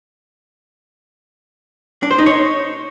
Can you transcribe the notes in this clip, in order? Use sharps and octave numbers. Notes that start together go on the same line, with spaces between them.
D4
C5
D#4
C#5